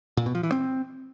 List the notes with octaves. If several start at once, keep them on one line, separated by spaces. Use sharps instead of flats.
A#2
B2
F3
E3
C4